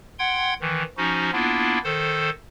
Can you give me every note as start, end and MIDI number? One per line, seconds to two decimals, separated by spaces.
0.19 0.54 78
0.19 0.54 79
0.19 0.54 84
0.19 0.54 92
0.61 0.83 51
0.61 0.83 52
0.97 1.31 53
0.97 1.31 61
0.97 1.31 63
0.97 1.31 66
1.33 1.79 58
1.33 1.79 59
1.33 1.79 62
1.33 1.79 64
1.33 1.79 65
1.84 2.30 51
1.84 2.30 69
1.84 2.30 72